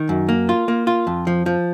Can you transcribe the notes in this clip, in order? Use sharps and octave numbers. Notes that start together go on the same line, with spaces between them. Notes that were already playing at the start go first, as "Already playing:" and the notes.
Already playing: D#3
F#2
A#3
F4
A#3
F4
F2
F3
F3